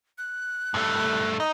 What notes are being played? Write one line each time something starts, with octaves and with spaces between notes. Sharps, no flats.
F#6
G2 A3
D#4 D#5